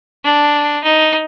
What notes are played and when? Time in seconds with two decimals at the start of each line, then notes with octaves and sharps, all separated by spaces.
0.24 D4
0.84 D#4